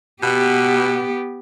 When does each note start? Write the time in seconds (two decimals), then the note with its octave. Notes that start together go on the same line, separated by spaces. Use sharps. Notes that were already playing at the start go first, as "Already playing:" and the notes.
0.23 B2 B3 G4